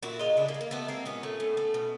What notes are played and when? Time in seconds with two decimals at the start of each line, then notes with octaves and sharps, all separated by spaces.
0.03 A#2 E4 F#4
0.19 G#3 D#4 F4
0.37 C#3 D4 E4
0.48 A#3
0.54 G#3
0.61 A#3
0.71 C3 A3 B3
0.88 G#3 A#3 C4
1.05 A#2 B3 C#4
1.23 A3
1.40 A2
1.57 A3
1.74 B2